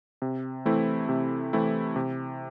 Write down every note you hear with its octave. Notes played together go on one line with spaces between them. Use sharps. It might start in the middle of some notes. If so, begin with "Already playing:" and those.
C3
E3 A3 C4 E4
C3
E3 A3 C4 E4
C3